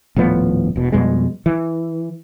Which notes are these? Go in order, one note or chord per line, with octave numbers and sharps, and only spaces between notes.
D#1 A2 F3 B3
E1 B2
F2 B2 G3 G#3
E3